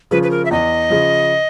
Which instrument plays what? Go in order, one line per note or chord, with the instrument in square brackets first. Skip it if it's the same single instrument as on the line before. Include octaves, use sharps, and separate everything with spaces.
[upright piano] C#3 F3 [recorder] B4
[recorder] B4
A#4
E5
[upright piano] E2 [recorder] D#5
[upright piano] C#3 F3